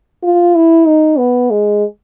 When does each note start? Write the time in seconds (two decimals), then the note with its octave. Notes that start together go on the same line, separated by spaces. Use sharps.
0.24 F4
0.56 E4
0.87 D#4
1.18 B3
1.51 G#3